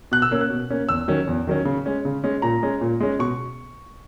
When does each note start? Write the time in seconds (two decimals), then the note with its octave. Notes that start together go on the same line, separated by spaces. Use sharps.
0.12 B2 F#6
0.22 E6
0.31 A#3 C#4
0.41 F#6
0.50 B2
0.70 A#3 C#4
0.88 E2 E6
1.08 D#3 F#3 C#4
1.27 E2
1.47 D#3 F#3 C#4
1.65 C#3
1.86 G#3 C#4
2.05 C#3
2.24 G#3 C#4
2.42 A#2 A#5
2.63 G#3 C#4
2.81 A#2
3.00 G#3 C#4
3.19 B2 C#6